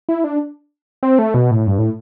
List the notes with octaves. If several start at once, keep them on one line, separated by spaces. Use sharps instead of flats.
E4
D4
C4
A3
B2
A2
G2
A2